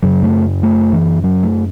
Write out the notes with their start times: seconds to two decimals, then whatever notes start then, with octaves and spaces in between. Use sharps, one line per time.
0.02 F#2 C#3 F#3
0.23 A3
0.63 A3
0.93 E3
1.24 F#3
1.43 A3